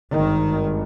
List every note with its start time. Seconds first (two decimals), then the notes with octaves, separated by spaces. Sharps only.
0.11 G#1 G2 D#3